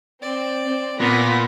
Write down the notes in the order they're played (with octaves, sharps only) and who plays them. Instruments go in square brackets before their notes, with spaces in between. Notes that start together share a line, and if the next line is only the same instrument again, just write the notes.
[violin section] C4 [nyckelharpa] D5
[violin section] C4
[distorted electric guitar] A#2 [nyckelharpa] B3 [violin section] F#5 B5 A#6